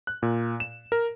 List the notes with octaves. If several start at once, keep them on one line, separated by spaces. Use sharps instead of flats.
F#6
A#2
E7
A#4